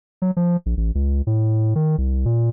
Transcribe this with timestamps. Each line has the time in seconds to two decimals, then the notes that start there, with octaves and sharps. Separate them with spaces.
0.22 F#3
0.37 F3
0.66 A#1
0.77 A1
0.95 C#2
1.27 A2
1.75 D#3
1.98 C2
2.26 A#2